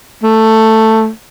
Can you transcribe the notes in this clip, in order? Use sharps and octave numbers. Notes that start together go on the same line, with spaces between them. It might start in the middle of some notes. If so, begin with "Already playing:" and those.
A3